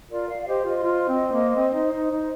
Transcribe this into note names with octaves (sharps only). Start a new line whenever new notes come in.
F4 A#4 D5
D5 F5
F5
G4 C5 D#5
F4 C5 D#5
F4
C4
A#3
C4
D#4
D#4
D#4